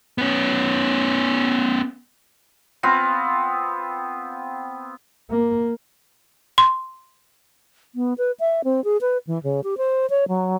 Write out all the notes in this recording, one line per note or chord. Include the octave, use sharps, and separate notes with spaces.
B3 C#4
B3 C4 F4
A#3
C6
B3
B4
E5
C4
G#4
B4
E3
C#3
G4
C5
C#5
F#3